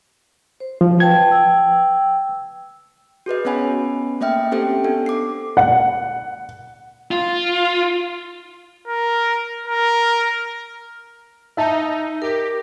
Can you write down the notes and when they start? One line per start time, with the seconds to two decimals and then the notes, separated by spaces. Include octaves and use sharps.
0.60 C5
0.81 F3
1.00 B4 G5 A5 G#6
1.31 G5 E6
3.26 F#4 G#4 B4 D#5
3.45 B3 C#4 C#5 F#5 G#5 B5
4.21 A3 A#3 D#5 E5 G5 F6
4.52 C4 C#4 G4 A4 C5 G5
4.84 B3 D4 A4
5.06 D6 C7
5.57 F#5
7.11 F4
8.88 A#4
9.66 A#4
11.57 D#4 E5 A5 A#5
12.22 G4 A#4